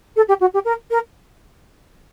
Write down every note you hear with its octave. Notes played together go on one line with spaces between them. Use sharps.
A4
G4
F#4
G4
A#4
A#4